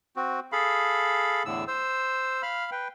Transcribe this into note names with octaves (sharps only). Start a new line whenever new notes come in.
C4 F#4
G#4 A4 F5 B5
E2 A2 D3 E6
C5 E6
F5 B5 F6
B4 G5